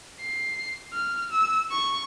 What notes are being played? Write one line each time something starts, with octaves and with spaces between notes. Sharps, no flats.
C7
F6
E6
C#6